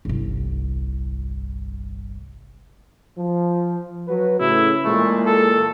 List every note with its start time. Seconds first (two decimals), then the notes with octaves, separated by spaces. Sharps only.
0.05 G1 C2
3.17 F3
4.08 F#3 F#4 B4
4.40 A2 C#3 E4
4.85 A#2 E3 G#3 A3
5.26 A4